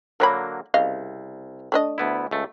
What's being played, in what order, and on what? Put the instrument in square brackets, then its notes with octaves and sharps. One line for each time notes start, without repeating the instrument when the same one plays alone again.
[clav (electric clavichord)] D3 F#3 A#3 [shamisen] A#4 C#5 B5
[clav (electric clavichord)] C2 [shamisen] C#3 D#5 F5
[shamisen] A3 D4 D#5
[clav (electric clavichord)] D2 B3 E4
C#2 A3